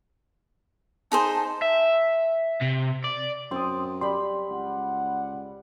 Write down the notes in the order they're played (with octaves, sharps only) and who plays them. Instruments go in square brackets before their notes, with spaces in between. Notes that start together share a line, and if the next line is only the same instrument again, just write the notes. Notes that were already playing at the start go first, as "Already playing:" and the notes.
[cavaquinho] D#4 G#4 C5 [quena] A5
[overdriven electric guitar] E5
C3
D5
[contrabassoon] F#2 [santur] C4 [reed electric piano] C6 D#6
[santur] G3 G5 B5 [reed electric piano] C6
[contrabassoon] C#2 [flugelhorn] F#5